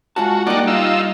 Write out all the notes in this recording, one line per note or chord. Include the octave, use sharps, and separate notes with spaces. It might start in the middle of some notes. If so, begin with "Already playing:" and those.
G#3 F4 F#4 A5
G3 A#3 D#4 D5 F#5
D#4 F4 E6